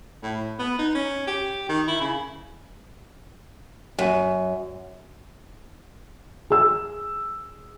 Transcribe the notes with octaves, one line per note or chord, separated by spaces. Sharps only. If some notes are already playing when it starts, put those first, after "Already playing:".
A2
B3
D#4
C#4
G4
D#3
E4
C#3
F#2
G#4 E6